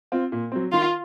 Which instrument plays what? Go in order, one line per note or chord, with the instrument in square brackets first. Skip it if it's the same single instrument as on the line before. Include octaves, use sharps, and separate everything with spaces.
[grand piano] C4 F4
A#2
F#3 C4
[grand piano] D#3 [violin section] F4